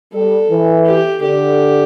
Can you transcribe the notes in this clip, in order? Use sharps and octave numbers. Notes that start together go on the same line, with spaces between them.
G3 A4
E3
G4
D3 G4